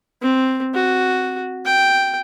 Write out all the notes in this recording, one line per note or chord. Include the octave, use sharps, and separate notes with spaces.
C4
F#4
G5